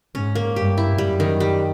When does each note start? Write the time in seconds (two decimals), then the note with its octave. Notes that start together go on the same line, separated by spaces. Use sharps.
0.15 G#2 C#4
0.35 A#3
0.56 G2 G4
0.78 E4
0.98 F#2 G3
1.20 D#3
1.40 G3